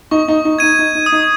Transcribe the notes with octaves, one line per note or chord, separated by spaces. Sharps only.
D#4 C#6
D#4
D#4
D#4 G#6 D#7
D#4
D#4
D#6
D#4